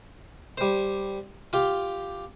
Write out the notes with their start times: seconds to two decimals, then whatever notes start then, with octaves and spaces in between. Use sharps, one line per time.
0.58 G3 C5
1.53 F4 G4